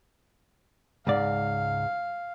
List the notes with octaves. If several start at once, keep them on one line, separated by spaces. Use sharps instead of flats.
C#2 G#2 D5 F5